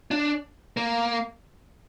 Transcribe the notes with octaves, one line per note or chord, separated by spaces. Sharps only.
D4
A#3